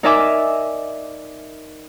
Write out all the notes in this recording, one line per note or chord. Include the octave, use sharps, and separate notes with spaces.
D#4 A#4 D5 E5 G#5 D6